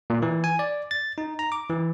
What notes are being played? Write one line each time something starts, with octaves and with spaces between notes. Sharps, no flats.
A#2
E3
G#5
D5
A6
D#4
A#5
D6
E3